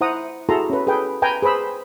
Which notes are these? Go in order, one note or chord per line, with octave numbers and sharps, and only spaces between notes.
E4 C5 F#5 A#5 D#6
E4 F#4 G#4 A4 A#5 C6
C#4 B4
G#4 A4 B4 G5
B4 G5 G#5 A#5
G#4 B4 C5 B5 E6